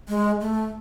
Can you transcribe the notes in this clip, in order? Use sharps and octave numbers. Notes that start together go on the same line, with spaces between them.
G#3
A3